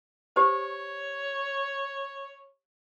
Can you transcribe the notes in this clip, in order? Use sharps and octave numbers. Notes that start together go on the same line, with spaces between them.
G4 C5 C#5